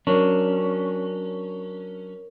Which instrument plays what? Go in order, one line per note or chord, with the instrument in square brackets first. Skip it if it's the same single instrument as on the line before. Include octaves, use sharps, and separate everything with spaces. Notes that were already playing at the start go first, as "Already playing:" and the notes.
[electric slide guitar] F#3 C#4 D4 [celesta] A#4 C#5